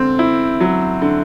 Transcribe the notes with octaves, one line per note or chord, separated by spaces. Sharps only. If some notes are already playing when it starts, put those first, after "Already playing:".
Already playing: D3 C4
E4
F#3
D3